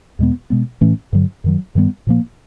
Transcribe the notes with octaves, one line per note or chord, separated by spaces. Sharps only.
E2 B2 G#3 B3
B2 G#3 B3
A2 E3 A3 C#4
G2 D3 F#3
F#2 D#3 F#3
G2 D#3 G3 B3
A#2 F3 A#3